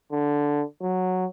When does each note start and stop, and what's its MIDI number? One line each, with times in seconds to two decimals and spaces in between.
0.12 0.62 50
0.82 1.26 54